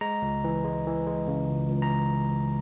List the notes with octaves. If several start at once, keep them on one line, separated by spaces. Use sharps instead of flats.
G#3 A#5
C#2
E3
G#3
E3
G#3
C#3
C#2
C#2
A#5